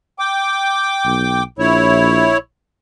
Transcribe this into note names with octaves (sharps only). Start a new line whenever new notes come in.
G5 D6
B1
A#1 E4 C#5